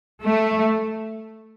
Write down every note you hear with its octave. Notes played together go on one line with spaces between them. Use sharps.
A3